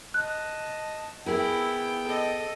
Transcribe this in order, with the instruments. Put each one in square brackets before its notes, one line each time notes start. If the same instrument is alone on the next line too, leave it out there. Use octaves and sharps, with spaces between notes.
[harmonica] D#5 A5 [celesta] F#6
[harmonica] B3 G5 [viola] E4 [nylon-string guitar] G#4 A#4
[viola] A4 D#5